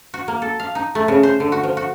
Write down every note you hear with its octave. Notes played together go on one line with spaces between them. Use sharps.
F#4
A#3
A4
F5
D#4
A3
C#3
C5
D3
F#4
F3
F#4